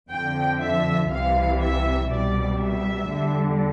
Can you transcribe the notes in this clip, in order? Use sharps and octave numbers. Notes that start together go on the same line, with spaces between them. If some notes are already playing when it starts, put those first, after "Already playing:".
F2 D3 F3 G5
E5
C2 C3 E3 G3 F5
E5
C2 B2 G3 D5
E5
E2 D3 G3